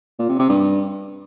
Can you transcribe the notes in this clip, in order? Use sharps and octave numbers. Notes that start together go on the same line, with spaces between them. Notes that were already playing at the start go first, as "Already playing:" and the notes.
A#2
C3
C3
G2